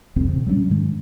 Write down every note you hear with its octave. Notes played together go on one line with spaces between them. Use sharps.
F1 C2 F2 C4
A#2 C#3
F#3 G3 A#3 C#4
G#2 D#3 G#3